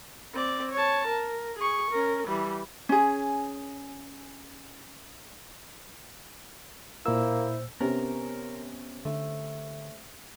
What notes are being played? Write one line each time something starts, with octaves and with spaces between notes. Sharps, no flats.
C4 D5
C#5 A5
A#4
G#4 C#6
C#4 A#4
E3 G3
C#4 G#4
A#2 A#3 E4 C5 E6
C3 B3 C#4 A#4
D3 A3